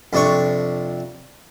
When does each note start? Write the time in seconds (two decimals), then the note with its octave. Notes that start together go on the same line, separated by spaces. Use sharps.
0.13 F2 C3 D4 C#5 C#6